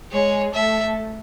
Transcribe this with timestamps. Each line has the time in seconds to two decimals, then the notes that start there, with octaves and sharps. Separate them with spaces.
0.12 G#3 G#4 C#5
0.54 A3 A4 E5